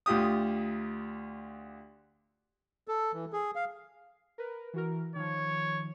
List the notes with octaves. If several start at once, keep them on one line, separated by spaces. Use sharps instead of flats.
D2 F4 G4 D#6
A4
E3
G#4
F5
A#4 B4
E3 F#4 A#4
D#3 F3 C#5